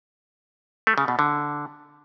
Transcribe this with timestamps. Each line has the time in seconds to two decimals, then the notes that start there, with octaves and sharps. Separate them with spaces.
0.87 A3
0.98 C#3
1.08 B2
1.19 D3